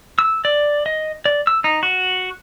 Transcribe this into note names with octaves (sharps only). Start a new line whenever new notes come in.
E6
D5
D#5
D5
E6
D#4
F#4